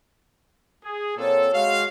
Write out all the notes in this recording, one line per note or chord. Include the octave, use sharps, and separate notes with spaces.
G#4
A#2 C#3 F#3 C4 A4 F#5
G#3 F#4 F5